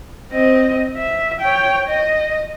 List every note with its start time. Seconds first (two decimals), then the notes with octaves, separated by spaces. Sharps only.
0.32 C4 D#5
0.97 E5
1.41 C#5 G5
1.87 D#5